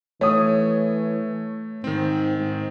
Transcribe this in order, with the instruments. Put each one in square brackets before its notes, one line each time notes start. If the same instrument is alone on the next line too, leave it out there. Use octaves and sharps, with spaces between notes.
[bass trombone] E3 [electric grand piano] A3 [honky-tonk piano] C#5 D#6
[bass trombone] G#2 [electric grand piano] D#3 C4
[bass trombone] G#2